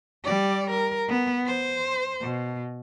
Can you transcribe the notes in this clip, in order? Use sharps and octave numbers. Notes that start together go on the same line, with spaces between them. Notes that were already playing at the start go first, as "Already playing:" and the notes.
G3 D5
A#4
B3
C5
B2